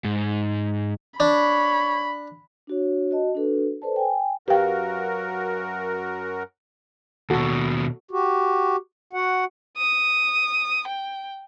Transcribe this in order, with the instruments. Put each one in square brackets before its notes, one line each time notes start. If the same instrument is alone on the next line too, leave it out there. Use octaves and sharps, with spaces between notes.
[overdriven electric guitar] G#2
[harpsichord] D4 [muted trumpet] C#5 [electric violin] B5
[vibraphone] D4 F#4 C#5
F#4 D#5 A5
D4 F#4 A4 B4
A4 B4 C5 D5 A5
G5 G#5
[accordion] F#2 F#4 A#4 [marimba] G4 G5 [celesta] B4 F5
[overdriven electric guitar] D#2 B2 [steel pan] F#4 A4
[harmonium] F#4 G4
F#4 F#5
[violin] D#6
G5